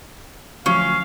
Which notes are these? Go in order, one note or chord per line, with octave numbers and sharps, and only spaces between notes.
D2 F3 F#3 C#4 F5